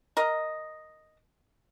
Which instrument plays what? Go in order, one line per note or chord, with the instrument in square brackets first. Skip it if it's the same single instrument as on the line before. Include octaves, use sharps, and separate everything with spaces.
[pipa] A#4 D#5